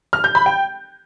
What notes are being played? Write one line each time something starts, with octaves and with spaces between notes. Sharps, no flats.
F6
G6
B5
G5